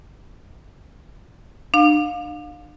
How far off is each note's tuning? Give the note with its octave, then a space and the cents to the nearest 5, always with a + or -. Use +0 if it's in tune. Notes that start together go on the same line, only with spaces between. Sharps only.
D4 +40 F5 +25